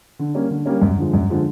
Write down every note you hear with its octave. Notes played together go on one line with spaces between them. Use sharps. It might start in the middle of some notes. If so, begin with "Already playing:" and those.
D3
G3 A#3 C#4
D3
G3 A#3 C#4
F#2
D3 F3 G#3
F#2
D3 F3 G#3